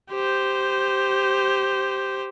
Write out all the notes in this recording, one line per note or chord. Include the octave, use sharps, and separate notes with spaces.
G4 C5